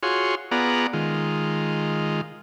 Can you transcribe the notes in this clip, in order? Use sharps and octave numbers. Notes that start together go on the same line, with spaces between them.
F4 F#4 G#4 C#5 C6
B3 F4 G#4 D5 F#5 A#5
D#3 G#3 F4